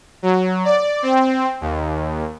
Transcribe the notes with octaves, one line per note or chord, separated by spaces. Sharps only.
F#3
D5
C4
D#2